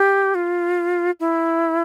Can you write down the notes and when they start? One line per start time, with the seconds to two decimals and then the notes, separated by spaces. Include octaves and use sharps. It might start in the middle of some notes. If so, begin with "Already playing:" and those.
Already playing: G4
0.35 F4
1.20 E4